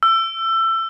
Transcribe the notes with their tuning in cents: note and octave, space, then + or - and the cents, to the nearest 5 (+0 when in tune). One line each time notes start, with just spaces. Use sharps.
E6 +25